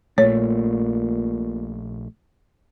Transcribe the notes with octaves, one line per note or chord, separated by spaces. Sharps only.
A#1 A#2 A3 C#5